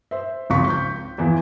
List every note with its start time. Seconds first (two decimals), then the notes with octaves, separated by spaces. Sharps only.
0.11 C5 E5
0.50 G#1 C#2 F3 C4 C#6 B6
0.70 G6
1.18 E2 E3 F3